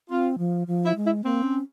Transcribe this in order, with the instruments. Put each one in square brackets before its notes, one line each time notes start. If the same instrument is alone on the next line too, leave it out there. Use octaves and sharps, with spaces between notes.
[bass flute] C4 [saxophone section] F4
[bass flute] F3
F3
[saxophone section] E4
[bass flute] G#3
[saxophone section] E4
[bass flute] A#3 [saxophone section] C4
[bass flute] C#4